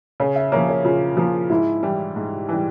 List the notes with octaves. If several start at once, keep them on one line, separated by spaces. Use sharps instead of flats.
C#3 C#5
E5
F3 A#3 C#5
C#5
C#3 F4
F3 A#3 F4
G#2 E4
E3 G3
G#2
E3 G3